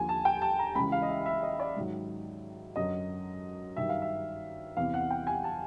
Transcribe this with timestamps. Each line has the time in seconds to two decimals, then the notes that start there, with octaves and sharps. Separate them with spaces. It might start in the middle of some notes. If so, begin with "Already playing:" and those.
Already playing: D#2 D3 F3 G#5
0.09 A5
0.25 G5
0.41 A5
0.59 A#5
0.75 C#2 C#3 E3 B5
0.92 F5
1.02 D#5
1.09 E5
1.26 E5
1.43 D#5
1.60 D5
1.76 G#2 D#3 F#3
2.76 F#2 D3 F#3 D#5
3.76 G2 D#3 F#3 E5
3.89 F5
4.02 E5
4.77 E2 C3 E3 F5
4.94 F#5
5.10 G5
5.27 G#5
5.44 A5